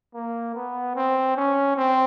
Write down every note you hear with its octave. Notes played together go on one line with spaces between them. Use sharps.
A#3
B3
C4
C#4
C4